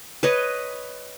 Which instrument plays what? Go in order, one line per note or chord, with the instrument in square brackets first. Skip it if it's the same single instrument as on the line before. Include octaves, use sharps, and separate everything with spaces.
[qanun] B4 C#5 D#5